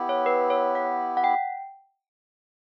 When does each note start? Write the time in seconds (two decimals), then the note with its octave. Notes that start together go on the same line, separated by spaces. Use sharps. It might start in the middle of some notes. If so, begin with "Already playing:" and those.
Already playing: B3 E4 G4
0.09 C#5
0.26 B4
0.50 C#5
0.75 F#5
1.17 F#5
1.24 G5